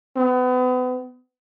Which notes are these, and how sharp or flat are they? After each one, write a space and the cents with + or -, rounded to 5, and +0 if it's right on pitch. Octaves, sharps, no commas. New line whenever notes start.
B3 +35